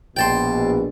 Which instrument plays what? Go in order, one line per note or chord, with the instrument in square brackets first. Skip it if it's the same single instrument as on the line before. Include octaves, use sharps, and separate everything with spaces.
[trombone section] A#1 B2 [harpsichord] G5 A5 C6